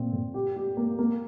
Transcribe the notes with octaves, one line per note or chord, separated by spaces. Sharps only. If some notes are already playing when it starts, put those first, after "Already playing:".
Already playing: A#2 C4
A#2
G4
G4
A#3
A#3